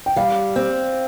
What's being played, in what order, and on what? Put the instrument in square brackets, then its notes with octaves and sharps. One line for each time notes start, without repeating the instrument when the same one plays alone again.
[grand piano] G5
[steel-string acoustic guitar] G3 [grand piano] F5
[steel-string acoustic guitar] C4